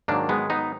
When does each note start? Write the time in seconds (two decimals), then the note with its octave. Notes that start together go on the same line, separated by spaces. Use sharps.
0.08 G#2 D#3 F#3 A#3 D4
0.29 G#3 B3
0.50 B3 D#4